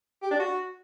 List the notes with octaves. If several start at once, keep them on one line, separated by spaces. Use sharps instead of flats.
G4
D4
F#4